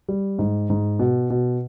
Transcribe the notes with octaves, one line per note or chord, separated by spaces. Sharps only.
G3
G#2
G#2
B2
B2